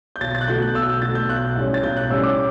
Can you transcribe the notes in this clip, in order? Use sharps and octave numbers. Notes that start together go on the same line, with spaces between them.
G6
B1 A6
A6
F#6
B2 A3 G6
F#6
B1 E6
G6
B2 A3 A6
G6
B1 F#6
A2 G3 C#4
A6
B1 G6
F#6
A2 G3 C#4 E6
D6